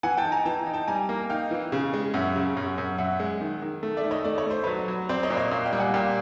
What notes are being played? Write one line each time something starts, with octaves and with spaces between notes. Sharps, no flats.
E3 F#5 G#5
G5 A5
D#4
G#5 A#5
E3 G5 A5
D#4
G5 A5
G3 G#5 A#5
A#3
D#4 F5 G5
E3
C#3
G#3
F#2 E5 F#5
C#3
F#2
F#2
F#2 E5 F#5
G#3
D#3
D#3
A3
D5 E5
D#3
C#5 D#5
A3 D5
C#5
A3 C5
F#3 B4 C#5
F#3
C4 C5 D5
C#5 D#5
A#2
C#5 D#5
A#2 D#5 F5
F5 G5
G3
F#5 G#5
A#2 F5 G5